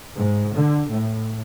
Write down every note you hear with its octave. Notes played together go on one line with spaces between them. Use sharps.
G#2
D3
A2